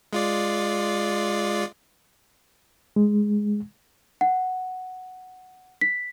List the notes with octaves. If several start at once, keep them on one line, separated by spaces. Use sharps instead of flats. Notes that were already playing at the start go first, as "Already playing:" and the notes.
G#3 F4 D5
G#3
F#5
B6